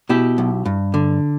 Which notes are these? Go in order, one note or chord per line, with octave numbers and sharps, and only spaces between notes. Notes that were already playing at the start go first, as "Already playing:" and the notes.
B2 E4 G4
B1
G2
D3